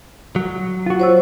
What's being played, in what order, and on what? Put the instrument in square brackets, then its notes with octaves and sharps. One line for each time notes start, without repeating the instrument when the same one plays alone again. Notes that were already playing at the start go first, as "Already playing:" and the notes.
[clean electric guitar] F#3
[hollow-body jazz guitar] F4 F#4
[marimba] C5 C#5 E6